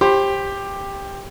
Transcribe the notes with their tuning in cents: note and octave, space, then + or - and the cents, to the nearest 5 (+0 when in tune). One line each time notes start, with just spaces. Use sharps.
G4 +10 C5 +30 B5 +35